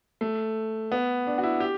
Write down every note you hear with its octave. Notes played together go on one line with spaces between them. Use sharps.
A3
B3
D4
F#4
E4
G4